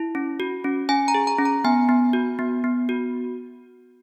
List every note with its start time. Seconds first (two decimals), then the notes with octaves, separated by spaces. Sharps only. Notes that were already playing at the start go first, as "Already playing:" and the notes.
Already playing: E4
0.15 C#4
0.40 F#4
0.64 C#4
0.89 C#4 G#5
1.08 A#5
1.14 G#4
1.27 A#5
1.39 C#4
1.45 A#5
1.64 B3 G#5
1.89 B3
2.13 F#4
2.39 B3
2.64 B3
2.89 F#4